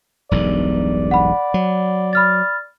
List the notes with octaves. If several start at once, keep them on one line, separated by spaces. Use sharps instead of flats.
E1 B1 G2 D5
F#5 B5
F#3
B5 F6 A6